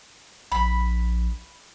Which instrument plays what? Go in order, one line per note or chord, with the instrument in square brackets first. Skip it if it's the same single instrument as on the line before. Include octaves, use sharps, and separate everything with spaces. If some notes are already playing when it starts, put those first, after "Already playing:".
[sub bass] A#1 [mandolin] B5